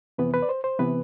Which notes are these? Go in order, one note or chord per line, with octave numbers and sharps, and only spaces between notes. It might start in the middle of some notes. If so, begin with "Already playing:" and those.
F2 C3 E3 B3 B4
B4
D5
C5
C5
C3 E3 B3 B4